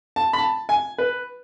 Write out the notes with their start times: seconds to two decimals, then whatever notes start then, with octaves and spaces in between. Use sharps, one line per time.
0.16 A5
0.33 B5
0.38 A5
0.69 G#5
0.98 B4